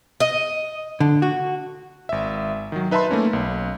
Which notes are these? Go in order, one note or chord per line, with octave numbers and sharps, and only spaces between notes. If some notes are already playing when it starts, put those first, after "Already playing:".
D#5
D3
F#4
G#1 E5
D#3 F#3
D#4 B4 E5 A5 B5 C6
A3 A#3 C#4
B1